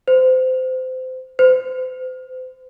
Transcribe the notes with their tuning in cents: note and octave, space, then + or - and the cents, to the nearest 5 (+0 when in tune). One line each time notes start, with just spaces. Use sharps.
C5 -25
C5 -35